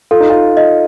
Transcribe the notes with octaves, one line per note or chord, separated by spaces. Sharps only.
F4 A4
D#4
F4
D#5